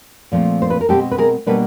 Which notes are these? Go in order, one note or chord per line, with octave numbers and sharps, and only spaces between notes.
A#2 F3 A3 C4
C5
B4
A#4
B2 G#3 C4 G4 A4
B4
G#4 A#4
B2 G3 A#3 D4 A4 B4